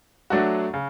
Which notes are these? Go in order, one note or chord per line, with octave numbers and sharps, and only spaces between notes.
F#3 A3 D4 F#4
C#3